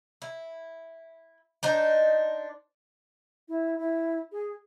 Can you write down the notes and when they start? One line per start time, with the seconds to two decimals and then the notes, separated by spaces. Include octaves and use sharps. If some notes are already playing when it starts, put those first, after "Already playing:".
0.22 E4
1.63 D4 D#4 C5
3.49 E4
3.79 E4
4.32 G#4